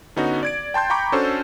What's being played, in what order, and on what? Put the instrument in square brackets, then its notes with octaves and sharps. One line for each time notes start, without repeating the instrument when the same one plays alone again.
[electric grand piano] D3 B3 C#4 D#4 F#4
D5 G#6 D7
G5 A5 C6 G6
G5 A#5 B5 C#6 D6 G6
C#4 D4 F#4 A4 C5